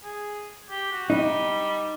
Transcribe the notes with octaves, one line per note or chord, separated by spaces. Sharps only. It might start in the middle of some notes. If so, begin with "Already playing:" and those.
G#4
G4
F#4
G3 D#4